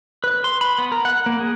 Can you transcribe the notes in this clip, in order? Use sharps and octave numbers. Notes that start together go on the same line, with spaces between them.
B4
C6
B5
B3
A#4
F#5
A#3
G#4